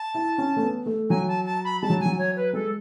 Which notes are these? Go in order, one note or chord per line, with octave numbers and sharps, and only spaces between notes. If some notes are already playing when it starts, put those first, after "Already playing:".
Already playing: A5
E4
C#4
A3
B3
A3
F#3 G#5
A5
A5
B5
G#3 A5
F#3
G#5
F#3
C#5
B4
G#3 A4